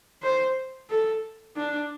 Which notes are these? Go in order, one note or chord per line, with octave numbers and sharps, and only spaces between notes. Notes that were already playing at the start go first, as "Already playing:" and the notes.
C5
A4
D4